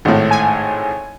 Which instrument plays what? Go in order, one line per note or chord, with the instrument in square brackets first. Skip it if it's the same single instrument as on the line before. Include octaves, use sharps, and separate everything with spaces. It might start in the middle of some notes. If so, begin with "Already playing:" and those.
[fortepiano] G#1 A2
[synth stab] G#5